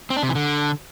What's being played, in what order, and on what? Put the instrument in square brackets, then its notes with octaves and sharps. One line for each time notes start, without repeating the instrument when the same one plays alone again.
[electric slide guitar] C4
D4
C3
E3
D3